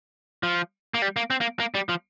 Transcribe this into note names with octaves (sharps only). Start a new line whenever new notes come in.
F3
A#3
G3
A#3
C4
A#3
A#3
G3
F3